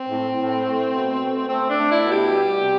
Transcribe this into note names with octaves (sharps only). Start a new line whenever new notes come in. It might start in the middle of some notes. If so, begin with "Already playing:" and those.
Already playing: C4
A2
A2
A3
B2
A3
A3 C4
D4
A3
E4
B2
G4
G3
C3